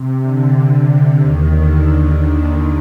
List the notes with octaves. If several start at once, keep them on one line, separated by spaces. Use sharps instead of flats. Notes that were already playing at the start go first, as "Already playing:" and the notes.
Already playing: C3
D3
C3
D3
D#2 D#3
D3
D#2 D#3